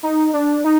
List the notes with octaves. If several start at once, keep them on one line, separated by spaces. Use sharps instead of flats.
D#4
D4
D#4